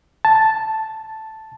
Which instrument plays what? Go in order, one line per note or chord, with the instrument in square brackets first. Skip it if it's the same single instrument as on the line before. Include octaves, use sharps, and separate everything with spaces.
[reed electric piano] A5